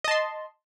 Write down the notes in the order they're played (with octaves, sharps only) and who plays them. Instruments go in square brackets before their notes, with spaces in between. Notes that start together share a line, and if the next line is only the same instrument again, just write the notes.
[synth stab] D#5
A5
C6